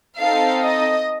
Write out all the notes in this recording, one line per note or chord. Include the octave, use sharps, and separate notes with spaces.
C4 D#4 A4 F5
D#5